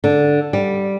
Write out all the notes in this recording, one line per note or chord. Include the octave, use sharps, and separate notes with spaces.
D3
G3